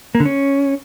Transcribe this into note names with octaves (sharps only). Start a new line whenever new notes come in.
A#3
D3
C#4